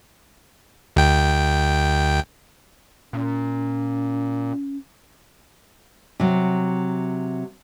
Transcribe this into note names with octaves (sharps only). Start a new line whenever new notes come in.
D2 G5
A#2 C#4
C3 F#3